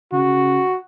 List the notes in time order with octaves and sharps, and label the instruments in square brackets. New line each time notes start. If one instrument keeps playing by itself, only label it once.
[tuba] C#3 [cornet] F#4